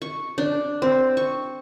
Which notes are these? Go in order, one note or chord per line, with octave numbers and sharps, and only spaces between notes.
C#6
D4
C4
C#6